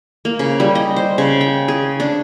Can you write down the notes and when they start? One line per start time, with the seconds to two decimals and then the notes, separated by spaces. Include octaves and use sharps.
0.25 A#3
0.39 C#3
0.60 G3
0.75 D#5
0.96 C5
1.18 C#3
1.41 G5
1.68 G#4
2.00 D4